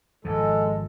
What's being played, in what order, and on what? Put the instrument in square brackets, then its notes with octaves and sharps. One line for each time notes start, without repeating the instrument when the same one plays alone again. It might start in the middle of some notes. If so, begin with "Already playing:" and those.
[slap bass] G#1 G#2 F3 [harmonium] G#3 A4